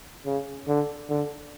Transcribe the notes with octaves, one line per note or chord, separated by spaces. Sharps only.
C#3
D3
D3